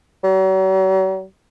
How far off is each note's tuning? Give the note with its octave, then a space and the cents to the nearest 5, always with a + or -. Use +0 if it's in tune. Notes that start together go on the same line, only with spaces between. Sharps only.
F#3 +45